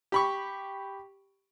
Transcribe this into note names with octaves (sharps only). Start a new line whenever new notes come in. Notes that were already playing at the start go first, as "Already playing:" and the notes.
G4 B5 C#6